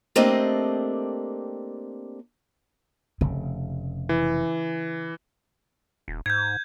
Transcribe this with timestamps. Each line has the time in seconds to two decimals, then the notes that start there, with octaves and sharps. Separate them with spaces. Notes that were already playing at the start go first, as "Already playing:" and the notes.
0.16 A3 A#3 C4 D4 G4 D#5
3.21 F1 C#3
4.09 E3
6.08 D#1
6.26 G#2 G6 G#6